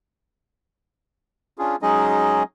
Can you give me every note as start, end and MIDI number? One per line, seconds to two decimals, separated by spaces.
1.59 1.76 61
1.59 1.76 62
1.59 1.76 65
1.59 1.76 68
1.82 2.43 54
1.82 2.43 56
1.82 2.43 61
1.82 2.43 63
1.82 2.43 68
1.82 2.43 75